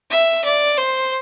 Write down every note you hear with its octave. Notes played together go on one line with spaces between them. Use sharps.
E5
D5
C5